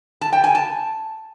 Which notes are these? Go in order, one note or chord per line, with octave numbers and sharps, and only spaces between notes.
A5
G5
G#5
A5